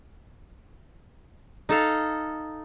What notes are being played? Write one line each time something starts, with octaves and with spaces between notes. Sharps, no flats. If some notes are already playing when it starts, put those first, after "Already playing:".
D#4 A4 F5